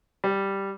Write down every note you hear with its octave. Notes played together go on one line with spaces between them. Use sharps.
G3